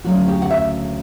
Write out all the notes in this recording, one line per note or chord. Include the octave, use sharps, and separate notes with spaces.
D2 C#3 F#3 A#3 F#4
G4
F#5
E5